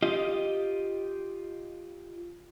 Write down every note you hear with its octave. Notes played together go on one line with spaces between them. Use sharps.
F4 G4 D#5